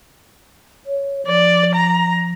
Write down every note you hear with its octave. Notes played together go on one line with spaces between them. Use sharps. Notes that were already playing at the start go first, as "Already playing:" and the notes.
C#5
F3 D5
A#5